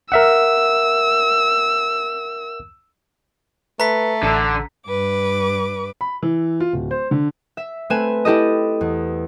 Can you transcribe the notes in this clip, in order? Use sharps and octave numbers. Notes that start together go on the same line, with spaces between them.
A#4 E5 F#5 E6
A3 B4 A#5 B6
A1 D3 A5 E6
G2 B4 D6
B5
E3
F4
D1
C5
D3
E5
A3 C4 B4 G#5 E7
E4 G4 A4 D#5
E2